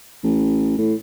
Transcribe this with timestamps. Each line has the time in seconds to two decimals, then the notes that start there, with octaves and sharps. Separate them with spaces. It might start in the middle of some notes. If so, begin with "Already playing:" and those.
0.24 A1
0.78 A2